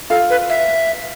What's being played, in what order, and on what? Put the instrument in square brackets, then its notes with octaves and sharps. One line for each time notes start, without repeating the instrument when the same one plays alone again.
[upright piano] F4 F5 [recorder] A4
[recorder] B4
E5